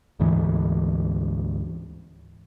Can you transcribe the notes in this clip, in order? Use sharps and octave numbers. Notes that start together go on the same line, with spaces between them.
D2 G#2 E3